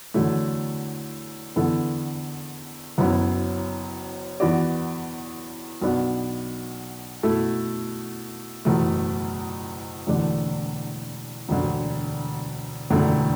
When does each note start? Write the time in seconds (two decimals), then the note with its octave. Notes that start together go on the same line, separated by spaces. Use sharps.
0.14 E2 D3 F#3 A3 E4
1.56 E2 D3 B3 E4 A4
2.98 F#1 F#2 F#3 B3 E4
4.40 E2 E3 B3 F#4 D5
5.82 B1 B2 B3 D4
7.23 B2 A3 E4 A4
8.65 F#1 E2 B2 A3
10.07 E1 E2 D3 A3 D4
11.49 E1 D2 D3
12.90 E1 E2 D3 A3 E4